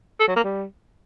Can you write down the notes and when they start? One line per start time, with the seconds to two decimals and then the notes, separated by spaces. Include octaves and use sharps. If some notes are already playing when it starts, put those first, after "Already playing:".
0.20 A4
0.28 F#3
0.36 A#3
0.44 G3